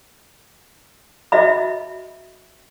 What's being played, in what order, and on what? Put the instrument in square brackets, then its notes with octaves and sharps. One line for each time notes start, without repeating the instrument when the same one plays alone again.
[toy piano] F#4 D#5 E5 B5